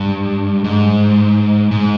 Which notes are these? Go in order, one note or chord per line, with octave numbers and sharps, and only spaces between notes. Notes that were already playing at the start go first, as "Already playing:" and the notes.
Already playing: G2
G#2
G#2